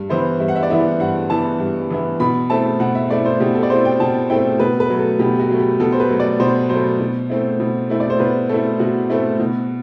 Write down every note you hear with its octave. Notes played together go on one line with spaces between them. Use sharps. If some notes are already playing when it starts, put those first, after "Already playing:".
Already playing: G2
E3 B3 E4 C5
G2 E5
F#5
E5
D5
E3 B3 E4 E5
G2 F#5
E3 B3 E4 A5
G2
E3 B3 E4
B2 B5
A3 C4 E4 A5
B2 F#5
E5
A3 C4 E4 D5
C5
B2 G4
A4
D5
A3 C4 E4 C5
G5
B2 A5
A3 C4 E4 G5
B2 B4
B4
F#3 A3
A4
B2 G4
F#4
F#3 A3
G4
B2 A4
C5
B4
F#3 A3
D5
B2 C5
F#3 A3 C5
B2
A3 C4 E4
B2
A3 C4 E4
D5
C5
B2 B4
A3 C4 E4 A4
B2 F#4
A3 C4 E4
B2